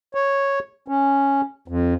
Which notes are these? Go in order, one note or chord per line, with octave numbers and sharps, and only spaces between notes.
C#5
C#4
F2